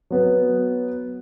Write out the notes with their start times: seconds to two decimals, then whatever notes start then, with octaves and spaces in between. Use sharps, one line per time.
0.10 F#3 B3